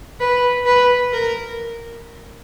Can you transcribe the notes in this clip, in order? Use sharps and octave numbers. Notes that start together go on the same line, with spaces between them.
B4
B4
A#4